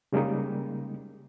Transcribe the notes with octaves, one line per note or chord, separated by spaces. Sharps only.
C#3 G3 G#3 A#3 D#4